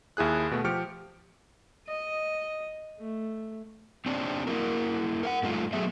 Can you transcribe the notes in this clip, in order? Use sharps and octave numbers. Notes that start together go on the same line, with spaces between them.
D#2 E4 G#4 F#6
B2 A3
F3 G4 F6 C#7 D7
D#5
A3
C4 D4 D#4 G4
A#3 E4 F#4 A#4
A#4 F5 F#5
G2 A3 D#4 F4
F#3 A3 B3 G#4 E5